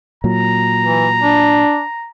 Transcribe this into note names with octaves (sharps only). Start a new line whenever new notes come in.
A#2 F#3 A#5
E3
D4